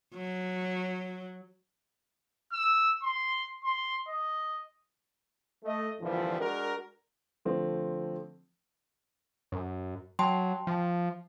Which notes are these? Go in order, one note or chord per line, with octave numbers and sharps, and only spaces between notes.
F#3
E6
C6
C6
D#5
A3 D#5
F2 A#2 D3 E3 F3 G3
G#3 D4 F#4 A#4
D3 F3 A3 C4
F#2
F#3 G5 A5 C6
F3